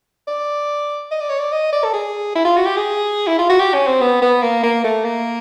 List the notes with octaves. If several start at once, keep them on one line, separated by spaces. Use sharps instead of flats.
D5
D#5
D5
C#5
D5
D#5
D5
A4
G#4
E4
F4
F#4
G4
G#4
E4
F4
F#4
G4
C#4
C4
B3
B3
A#3
A#3
A3
A#3